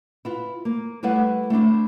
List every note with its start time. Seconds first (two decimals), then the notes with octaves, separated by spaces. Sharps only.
0.25 E4 F4 B4
0.65 A#3
1.03 G3 A3 E4 B4 F5 F#5
1.50 A3 C4 D4 E4